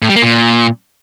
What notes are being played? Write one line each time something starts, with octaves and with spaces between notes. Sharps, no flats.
A2
G3
A#3
A#2